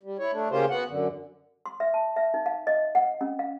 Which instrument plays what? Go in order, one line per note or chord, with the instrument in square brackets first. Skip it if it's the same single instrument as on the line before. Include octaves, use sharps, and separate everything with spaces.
[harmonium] G3
E4 C#5
A3 D4
C#3 A#3 C#4 F4 G4 C5
B3 F#4 F#5
F#2 D3
[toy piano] C6
E5
A5
E5
D#4
F5
D#5
F#5
C#4
F5